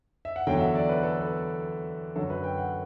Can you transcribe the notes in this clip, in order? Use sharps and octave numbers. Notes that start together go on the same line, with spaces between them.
E5
F#5
E2 D3 F#3 G5
F#5
E5
D5
B4
A4
B4
F#2 D3 F#3 A4
B4
G5
F#5